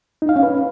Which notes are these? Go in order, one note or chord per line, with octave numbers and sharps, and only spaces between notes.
D#4
F5
C#4
B4